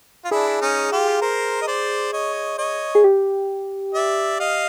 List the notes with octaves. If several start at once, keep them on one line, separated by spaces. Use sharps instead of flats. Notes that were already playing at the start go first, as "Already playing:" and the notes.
F4
D4 E4 G#4
C#4 D#4
F4 G4
A#4 C5
D#5
C5 D5
C#5 D#5
C#5 D#5
G#4
G4
D5 E5
D#5 F5